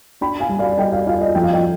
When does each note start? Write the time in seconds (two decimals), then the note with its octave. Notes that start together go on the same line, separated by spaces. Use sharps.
0.21 D4 G5 B5
0.40 F5 G#5
0.49 G3
0.59 D5 F5
0.78 G3 D#5 G5
0.92 D5 F5
1.06 F4 D5 F5
1.21 D#5
1.35 F3 G5
1.44 F5
1.53 D#5 G5